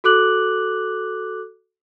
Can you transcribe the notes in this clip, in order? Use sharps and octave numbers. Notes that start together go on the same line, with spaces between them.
F#4 A4 D6 F#6 F#7